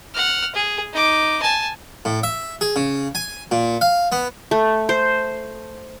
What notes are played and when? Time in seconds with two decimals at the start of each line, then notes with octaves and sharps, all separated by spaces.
0.14 F#5 F6
0.55 G#4
0.93 D#4 D6
1.42 G#5 A5
2.05 A2
2.23 E5
2.61 G#4
2.76 C#3
3.15 G#5
3.51 A#2
3.81 F5
4.12 B3
4.51 A3
4.89 C5